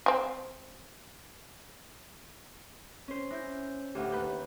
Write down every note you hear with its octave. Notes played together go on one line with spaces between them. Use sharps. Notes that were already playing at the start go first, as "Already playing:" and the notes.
C4 G#4
C#4 C5
C#4 E4 G6
D2 A2 G4 F#5
D#2 B4 G6